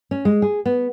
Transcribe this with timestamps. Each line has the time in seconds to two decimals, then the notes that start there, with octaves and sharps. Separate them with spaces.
0.11 C#4
0.25 G#3
0.42 G#4
0.66 B3